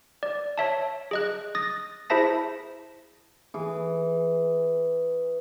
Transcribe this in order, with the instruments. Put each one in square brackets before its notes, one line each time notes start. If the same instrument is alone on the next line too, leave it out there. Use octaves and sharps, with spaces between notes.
[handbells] D5
C#5 E5 A5
G#4 D#5 F#6
D#6 A6 A#6
E4 G#4 C5 E5 A5 A#6
[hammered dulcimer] E3 G#4